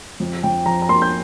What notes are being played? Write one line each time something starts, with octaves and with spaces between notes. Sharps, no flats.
F2
F2 G5
F3 A#5
A#5
A#3 C6
G6